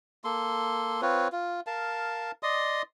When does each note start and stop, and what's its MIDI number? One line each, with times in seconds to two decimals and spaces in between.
0.24 1.01 58
0.24 1.01 69
0.24 1.01 84
1.02 1.28 60
1.02 1.28 65
1.02 1.28 71
1.02 1.28 73
1.32 1.60 65
1.67 2.32 70
1.67 2.32 77
1.67 2.32 81
2.43 2.82 74
2.43 2.82 75
2.43 2.82 84
2.43 2.82 87